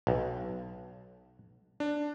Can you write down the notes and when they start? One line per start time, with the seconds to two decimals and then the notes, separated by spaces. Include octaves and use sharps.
0.07 B1
1.80 D4